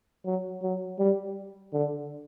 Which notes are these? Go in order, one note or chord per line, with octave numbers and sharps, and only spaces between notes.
F#3
F#3
G3
D3